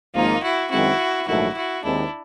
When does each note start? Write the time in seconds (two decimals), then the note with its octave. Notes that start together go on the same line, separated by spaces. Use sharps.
0.15 G#1 G#2 F3 A#3 D#4 F4
0.43 E4 F#4
0.71 F#2 D#3 G#3 C4 E4 F#4
1.28 A#1 G#2 D#3 F#3 A3 E4 F#4
1.56 E4 F#4
1.84 D#2 D#3 G#3 C4 D4 E4